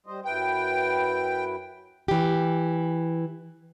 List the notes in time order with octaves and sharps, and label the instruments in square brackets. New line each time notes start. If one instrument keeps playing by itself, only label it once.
[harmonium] G3 C5 D#5
[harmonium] F#2 E4 B4 [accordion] G5
[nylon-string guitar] E3 G4